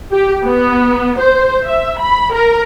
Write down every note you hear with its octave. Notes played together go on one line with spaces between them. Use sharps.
G4
B3
C5
E5
B5
A#4